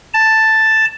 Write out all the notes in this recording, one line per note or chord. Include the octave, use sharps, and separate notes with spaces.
A5